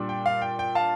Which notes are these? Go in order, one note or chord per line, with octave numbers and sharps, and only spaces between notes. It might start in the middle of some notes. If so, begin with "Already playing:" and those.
Already playing: A#2 G3 D4
G5
F5
G5
G5
F5 A5